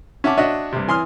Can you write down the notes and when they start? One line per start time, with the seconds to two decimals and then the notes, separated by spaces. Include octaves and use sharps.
0.24 C#4 E5 F#5 A5 D6
0.38 D4 F#4 C#5 D#5 E5
0.72 G2 C3
0.88 E3 G#5 C6 D#6 F6